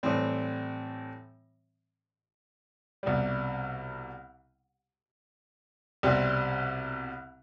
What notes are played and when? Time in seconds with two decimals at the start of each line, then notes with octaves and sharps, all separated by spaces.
0.03 A2 E3 G3 C4
3.03 C2 B2 G3
6.03 C2 B2 G3 C4 G4